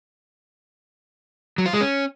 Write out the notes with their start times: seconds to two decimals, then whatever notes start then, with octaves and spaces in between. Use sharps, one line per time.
1.58 F#3
1.66 F4
1.73 G#3
1.81 C#4